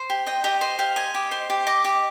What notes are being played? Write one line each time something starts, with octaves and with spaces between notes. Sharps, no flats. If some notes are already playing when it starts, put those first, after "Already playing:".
Already playing: C5
G4
D#5 G5
G4 D#5
C5 D#5
G4 F5
D#5 G#5
G4
C5 C6
G4
D#5 D6
G4 D6